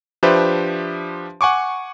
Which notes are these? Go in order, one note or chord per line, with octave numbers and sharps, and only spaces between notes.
F3 D4 G4 B4 C5 E5
F#5 G#5 C#6 D6